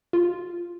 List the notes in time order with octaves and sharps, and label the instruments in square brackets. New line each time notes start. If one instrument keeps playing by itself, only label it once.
[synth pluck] F4